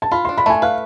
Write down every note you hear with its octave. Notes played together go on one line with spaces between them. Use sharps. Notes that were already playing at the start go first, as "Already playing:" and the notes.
A5
F4 B5
D4 C6
B5
A3 G#5 A5
B4 F5